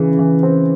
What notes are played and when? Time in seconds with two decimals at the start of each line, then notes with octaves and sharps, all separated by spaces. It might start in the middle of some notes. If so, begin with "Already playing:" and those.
Already playing: C#3 E3
0.19 E3
0.43 C4